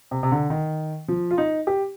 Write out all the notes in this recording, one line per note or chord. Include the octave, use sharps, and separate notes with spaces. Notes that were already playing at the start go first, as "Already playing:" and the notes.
C3
C3
D3
D#3
F3
F4
D#4
G4